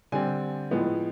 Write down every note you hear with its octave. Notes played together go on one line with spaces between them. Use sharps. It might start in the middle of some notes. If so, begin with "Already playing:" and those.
D3 G3 C4 G#5
A2 F3 G#3 B3